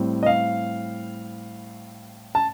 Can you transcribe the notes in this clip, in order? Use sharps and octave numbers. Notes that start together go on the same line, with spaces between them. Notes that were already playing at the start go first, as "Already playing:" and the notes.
Already playing: A2 G3 C4
D#5
F5
A5